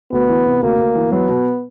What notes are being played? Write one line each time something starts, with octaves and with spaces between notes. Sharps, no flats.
D2 B3
E3
C3
D2 A#3
D2
E3
F#3 B3
B2